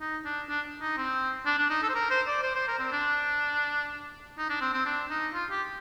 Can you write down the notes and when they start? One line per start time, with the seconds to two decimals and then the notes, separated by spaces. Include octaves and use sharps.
0.01 D#4
0.25 D4
0.49 D4
0.81 D#4
0.97 C4
1.46 D4
1.59 D4
1.70 D#4
1.83 A4
1.90 C5
1.95 A#4
2.10 C5
2.27 D5
2.43 C5
2.55 C5
2.68 A#4
2.79 C4
2.92 D4
4.38 D#4
4.50 D4
4.61 C4
4.73 C4
4.86 D4
5.10 D#4
5.34 F4
5.51 G4